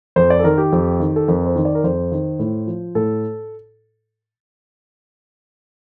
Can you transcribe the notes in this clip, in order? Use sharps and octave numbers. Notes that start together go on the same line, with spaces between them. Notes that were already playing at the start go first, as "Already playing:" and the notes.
F2 C5
D5
A4
D#3 A#4
G4
F2
D#3
A4
F2 A#4
C5
D#3
D5
A#4
F2 C5
D#3
A2
F3
A2 A4